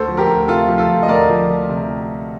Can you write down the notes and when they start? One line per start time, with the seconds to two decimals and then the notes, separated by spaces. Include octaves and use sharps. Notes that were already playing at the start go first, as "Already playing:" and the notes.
Already playing: D2 A4 C5
0.08 F3
0.17 G4 A#4
0.27 D2
0.48 C3 F4 A4
0.68 F3
0.78 F4 A4
0.89 F3
1.03 D#5
1.08 D2 A#4 D5
1.29 F3
1.50 F3
1.69 C3